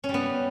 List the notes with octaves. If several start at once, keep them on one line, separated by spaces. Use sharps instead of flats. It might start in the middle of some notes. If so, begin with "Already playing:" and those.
C#4
G3
B3